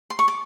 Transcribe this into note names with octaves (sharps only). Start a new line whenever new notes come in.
C6
C#6
D6